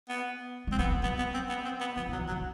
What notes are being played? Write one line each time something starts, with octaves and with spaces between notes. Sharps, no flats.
B3
G3
C4
F#3 B3
G3
F#3 B3
B3
C4
B3
C4
B3
F3 B3
E3
F#3
F#3
D#3